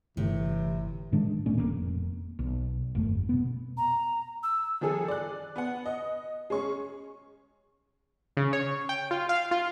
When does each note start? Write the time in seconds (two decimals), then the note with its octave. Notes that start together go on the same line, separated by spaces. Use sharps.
0.17 G1 A2 C3 E3
1.12 A2 D#3 G#3 D4
1.46 E1 A#2 A3 C#4
1.58 F1 D#2 A#3
2.39 B1
2.95 G1 F2 A3
3.29 B2 B3
3.77 A#5
4.43 E6
4.81 D#3 F3 G3 G#4 A4
5.08 D5 F#6
5.56 B3 F#5
5.86 D#5
6.50 G#3 C#4 C#6
8.37 C#3
8.53 C#5
8.89 G5
9.11 F4
9.29 F5
9.51 F4